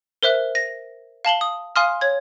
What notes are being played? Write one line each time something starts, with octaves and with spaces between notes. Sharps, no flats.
A#4 C5 E5 F#6
A#6
F5 A5 F#7 G7
D#6
F5 G#5 C6 D#6 F6
C#5 G#6